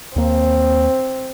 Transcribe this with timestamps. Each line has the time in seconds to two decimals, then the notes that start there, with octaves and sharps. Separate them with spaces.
0.16 D#2 A#3 C4